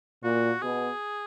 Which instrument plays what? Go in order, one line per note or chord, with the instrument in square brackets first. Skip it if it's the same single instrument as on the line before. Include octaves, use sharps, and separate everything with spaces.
[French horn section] A#2 [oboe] F#4
[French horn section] B2 [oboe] G#4